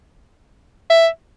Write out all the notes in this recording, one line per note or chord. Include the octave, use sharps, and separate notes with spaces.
E5